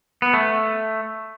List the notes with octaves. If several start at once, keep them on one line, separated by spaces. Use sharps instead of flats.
B3
A3